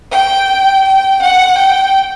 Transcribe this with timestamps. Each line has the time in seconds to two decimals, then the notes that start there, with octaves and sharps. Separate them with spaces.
0.12 G5
0.85 G5
1.20 F#5
1.57 G5